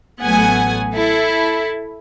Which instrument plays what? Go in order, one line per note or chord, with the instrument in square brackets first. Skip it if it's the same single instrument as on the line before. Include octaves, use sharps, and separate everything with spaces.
[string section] A1 F#3 A3 B3 F#5 G#5
E4 A4